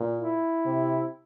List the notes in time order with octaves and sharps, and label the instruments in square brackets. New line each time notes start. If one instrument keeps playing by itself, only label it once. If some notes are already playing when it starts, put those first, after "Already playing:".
Already playing: [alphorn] A#2
[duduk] E4
[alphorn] C3